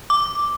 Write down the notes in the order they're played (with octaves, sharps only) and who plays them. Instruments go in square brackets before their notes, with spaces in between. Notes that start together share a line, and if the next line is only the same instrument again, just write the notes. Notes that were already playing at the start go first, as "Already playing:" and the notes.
[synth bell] D6